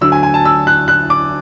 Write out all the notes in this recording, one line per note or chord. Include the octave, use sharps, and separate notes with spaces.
D2 D3 F#3 E6
G#5
G#5
A5
E6
F#6
F#6
D6